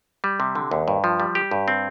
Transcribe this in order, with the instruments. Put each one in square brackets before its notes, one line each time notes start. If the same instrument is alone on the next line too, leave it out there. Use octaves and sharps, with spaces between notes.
[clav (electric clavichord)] G3
C3
D3
D#2
G2
F3
G3
G4
G2
C4